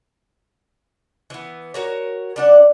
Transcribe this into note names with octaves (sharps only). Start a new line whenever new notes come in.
E3 B3
F#4 A#4 C#5
G3 D4 F#5